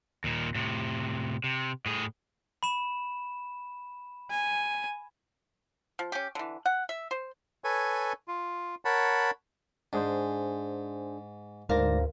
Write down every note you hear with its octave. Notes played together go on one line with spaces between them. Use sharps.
D#2 A#2
A2 C3
C3
A2 G#4
B5 E7
G#5
F3
C#4 G4
D3 E3
F#5
E5
C5
A4 B4 C#5 G#5
F4
A#4 C#5 F#5 A5 B5
G#2 D4 G#4 C5
D2 G#2 A#4 C5 D5 F5 A#6